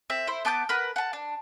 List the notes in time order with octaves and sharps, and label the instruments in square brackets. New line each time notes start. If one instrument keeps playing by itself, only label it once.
[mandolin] C4 E5
E4 C5
B3 A5 D6 G6
A#4 B4 F#5
F#5 A5
D4